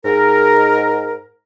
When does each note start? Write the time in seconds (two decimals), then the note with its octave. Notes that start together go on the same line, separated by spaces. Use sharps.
0.05 G#2 A#4